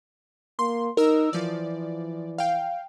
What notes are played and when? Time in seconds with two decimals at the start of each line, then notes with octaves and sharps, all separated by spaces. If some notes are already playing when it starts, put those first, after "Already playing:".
0.59 A#3 C6
0.97 D#4 A#4 E6
1.33 E3 F3 D5
2.38 F5 G5